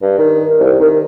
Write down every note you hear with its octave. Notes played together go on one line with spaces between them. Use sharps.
G2
D#3
C2
D#3